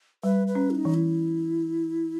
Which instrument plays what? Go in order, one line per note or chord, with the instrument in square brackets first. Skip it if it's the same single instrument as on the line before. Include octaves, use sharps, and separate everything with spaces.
[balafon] G3 [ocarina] B4
[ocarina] B4
[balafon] C#4
[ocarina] E4
D#4
[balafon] E3
[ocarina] E4